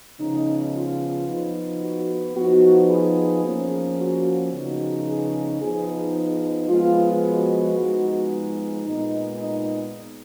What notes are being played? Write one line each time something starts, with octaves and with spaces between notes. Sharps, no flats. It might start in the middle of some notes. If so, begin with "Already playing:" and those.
C#3 F3 B3 D#4
F4
F3 B3 D#4
F#4
F3 B3 D#4 F#4
G#4
F3 A#3 C#4
F#4
C#3 F3 B3 D#4 F#4
G#4
F3 B3 D#4 G#4
F3 G#3 B3 F4
F#4
F3 G#3 B3 D#4
A#2 G#3 B3 D#4
D#4